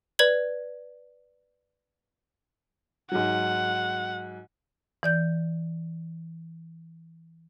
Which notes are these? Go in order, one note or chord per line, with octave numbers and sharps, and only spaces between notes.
B4 D5 G#6 F#7
G#2 F#3 F#5
E3 D5 G6